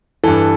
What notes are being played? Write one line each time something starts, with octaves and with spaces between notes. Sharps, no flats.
G2 E3 A4